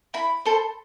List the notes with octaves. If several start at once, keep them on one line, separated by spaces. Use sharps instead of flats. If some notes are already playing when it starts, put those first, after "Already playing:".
E4 B5
A4 C5